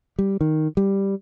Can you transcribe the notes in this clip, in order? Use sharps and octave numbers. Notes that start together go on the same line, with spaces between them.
G3
D#3
G3